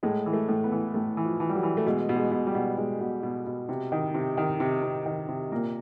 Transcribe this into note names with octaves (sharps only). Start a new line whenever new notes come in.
A2 G#3
E3
A3
A2
B3
E3
A2 A3
E3
F3
E3
G3
F#3
E3
A3
B2 G#3
B2
G#3
B2
G3
B2
B2 G#3
B2
B2
B2
C3
D#3
C3
D#3
C3
C3
D#3
C3
A#2 A#3